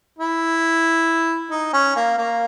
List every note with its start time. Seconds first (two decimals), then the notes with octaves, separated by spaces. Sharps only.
0.19 E4
1.51 D#4
1.73 C#4
1.96 A#3
2.18 A#3